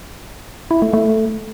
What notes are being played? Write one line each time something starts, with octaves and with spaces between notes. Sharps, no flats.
E4
A3
A3